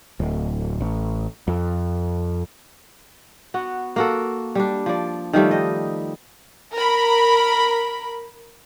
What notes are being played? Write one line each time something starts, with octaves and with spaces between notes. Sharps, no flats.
D1
A1
F2
B3 F#4
A#3 F#4 A4
G3 D4
F3 D5
D#3 F3 G3 A3
D#5
A#4 B5